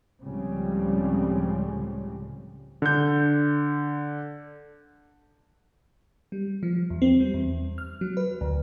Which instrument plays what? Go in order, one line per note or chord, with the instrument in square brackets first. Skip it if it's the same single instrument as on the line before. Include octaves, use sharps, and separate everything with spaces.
[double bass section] C#2 A2 C#3 F3 G3 C4
[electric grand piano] D3 G6
[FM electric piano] G3
F3
E2
C4
G3
E2
F6
F#3
B4
D2